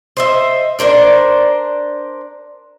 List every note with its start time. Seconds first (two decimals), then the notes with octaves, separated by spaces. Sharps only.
0.17 C5 D#5 E5
0.79 D4 A#4 C5 D5